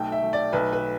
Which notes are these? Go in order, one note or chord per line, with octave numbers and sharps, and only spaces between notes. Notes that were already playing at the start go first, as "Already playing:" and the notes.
Already playing: B1 A3 G5
E5
A3
D5
B1 B4
B4